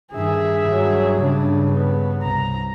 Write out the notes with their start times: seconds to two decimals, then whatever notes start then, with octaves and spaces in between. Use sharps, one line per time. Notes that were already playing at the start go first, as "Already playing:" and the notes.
0.13 G2 D#3 G#4 E5
0.67 G2 F#3
1.19 G2 C#3 D4
1.70 B3
2.23 C2 A#5